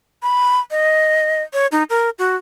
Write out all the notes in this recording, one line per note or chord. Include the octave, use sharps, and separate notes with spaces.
B5
D#5
C#5
D#4
A#4
F#4